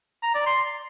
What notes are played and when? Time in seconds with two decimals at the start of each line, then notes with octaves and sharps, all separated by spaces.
0.23 A#5
0.35 D5
0.46 C6